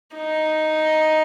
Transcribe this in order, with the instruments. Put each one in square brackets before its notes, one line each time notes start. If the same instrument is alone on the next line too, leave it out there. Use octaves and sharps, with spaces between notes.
[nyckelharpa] D#4